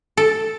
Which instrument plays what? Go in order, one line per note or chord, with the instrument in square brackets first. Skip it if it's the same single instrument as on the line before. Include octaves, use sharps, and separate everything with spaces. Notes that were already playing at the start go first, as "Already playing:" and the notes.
[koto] A4